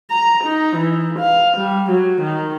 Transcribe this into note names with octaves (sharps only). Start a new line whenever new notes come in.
A#5
D#4
E3
F5
G3
F#3
D#3